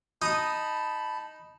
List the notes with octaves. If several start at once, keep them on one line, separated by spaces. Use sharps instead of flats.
D#4 A5 B5 D#6